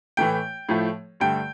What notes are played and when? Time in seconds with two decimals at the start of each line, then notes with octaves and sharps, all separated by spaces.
0.17 A2 E3 A3 G5
0.69 A2 F3 A3
1.20 G2 D3 A3 G5